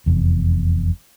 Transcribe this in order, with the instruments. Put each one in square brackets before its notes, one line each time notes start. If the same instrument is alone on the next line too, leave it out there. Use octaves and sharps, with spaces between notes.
[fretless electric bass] F1 E2